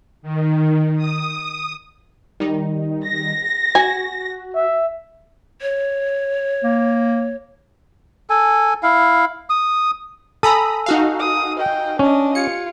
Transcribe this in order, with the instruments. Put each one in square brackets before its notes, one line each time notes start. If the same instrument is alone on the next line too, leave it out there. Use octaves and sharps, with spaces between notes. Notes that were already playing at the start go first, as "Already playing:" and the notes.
[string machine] D#3
D#6
[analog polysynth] D#3 G3 D#4
[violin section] A#6
[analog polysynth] F#4 [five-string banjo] G#5
[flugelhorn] E5
[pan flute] C#5
[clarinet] A#3
[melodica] A4 G#5
E4 F5
D#6
[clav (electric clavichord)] A4 [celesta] G#5 E6 [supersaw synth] A#5 B5 D#6
[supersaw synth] D#4 F#4 F5
[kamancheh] D#6
D#5 G5
[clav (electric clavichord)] C#4 [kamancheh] D4 D#5
[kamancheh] F4 [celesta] G4 G#6 [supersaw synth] C#7